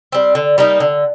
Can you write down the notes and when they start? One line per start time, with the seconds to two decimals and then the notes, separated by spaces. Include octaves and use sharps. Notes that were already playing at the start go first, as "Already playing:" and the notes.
0.12 G3 C4
0.35 D3
0.58 G3 A#3 D#4
0.80 D3